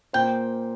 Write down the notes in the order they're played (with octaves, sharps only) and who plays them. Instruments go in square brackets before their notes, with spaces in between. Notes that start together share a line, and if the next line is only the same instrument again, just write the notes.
[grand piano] A#2 A#3 F4 C5 [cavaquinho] G5